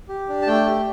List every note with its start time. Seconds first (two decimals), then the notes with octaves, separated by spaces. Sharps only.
0.09 G4
0.29 D4
0.42 A5
0.47 A3 G5
0.67 G4